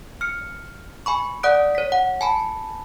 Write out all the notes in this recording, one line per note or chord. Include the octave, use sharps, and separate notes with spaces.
F6 C#7
G#5 B5 C#6
D5 F#5 D#6 F#6 D7
C#5 B6
F#5
G#5 A5 B5